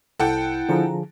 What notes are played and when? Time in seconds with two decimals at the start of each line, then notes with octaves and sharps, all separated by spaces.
0.20 C2 E4 A4 F#5 G5
0.69 D3 F3 G#4 A5 A#5